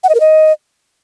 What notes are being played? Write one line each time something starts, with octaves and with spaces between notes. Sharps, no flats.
F#5
D#5
A#4
D#5